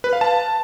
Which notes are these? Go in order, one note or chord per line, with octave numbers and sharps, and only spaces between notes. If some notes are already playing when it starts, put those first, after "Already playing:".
B4
F5
A5